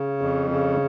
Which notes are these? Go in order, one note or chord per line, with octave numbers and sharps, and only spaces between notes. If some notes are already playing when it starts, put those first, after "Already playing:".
Already playing: C#3
F2
C#3